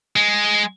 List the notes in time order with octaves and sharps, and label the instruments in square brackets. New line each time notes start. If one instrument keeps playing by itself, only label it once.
[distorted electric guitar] G#3